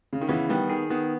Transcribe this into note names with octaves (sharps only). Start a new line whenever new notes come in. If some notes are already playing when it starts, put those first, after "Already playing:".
C#3
D#3
C#3 E3 B3
D#3 G3 B3
D#3 G#4
D#3 B3